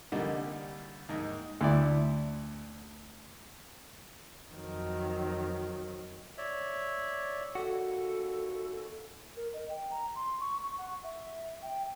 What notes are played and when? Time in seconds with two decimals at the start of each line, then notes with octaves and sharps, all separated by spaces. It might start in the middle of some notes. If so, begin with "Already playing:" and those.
0.12 C2 D3 G3 A#3 D#4
1.09 D#2 G#2 D#5
1.61 D2 E4 D5
4.52 F2 D#3 F#3
6.38 C#5 D5 E5
7.55 D#2 F#4 A4
9.37 A#4
9.54 D#5
9.70 G5
9.91 A#5
10.16 C6
10.40 C#6
10.63 C#6
10.78 F#5
11.03 E5
11.62 G5